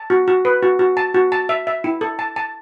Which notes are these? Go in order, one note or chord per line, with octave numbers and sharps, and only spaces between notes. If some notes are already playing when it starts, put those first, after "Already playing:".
Already playing: A5
F#4
F#4
B4
F#4
F#4
A5
F#4
A5
E5
E5
E4
A4
A5
A5